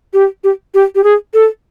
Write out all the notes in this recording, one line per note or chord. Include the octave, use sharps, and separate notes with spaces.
G4
G4
G4
G4
G#4
A4